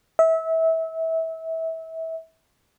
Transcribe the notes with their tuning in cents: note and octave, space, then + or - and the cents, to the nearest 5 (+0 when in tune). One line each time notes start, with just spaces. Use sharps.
E5 -25